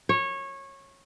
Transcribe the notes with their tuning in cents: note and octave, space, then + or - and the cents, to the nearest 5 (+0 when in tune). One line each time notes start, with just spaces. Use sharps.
C#5 -20